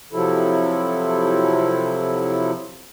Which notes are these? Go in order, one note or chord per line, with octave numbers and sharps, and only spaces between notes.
C3 F3 F#3 E4 A4